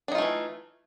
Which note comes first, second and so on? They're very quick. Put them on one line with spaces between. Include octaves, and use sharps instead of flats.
D4 D#4 F4 A3 E3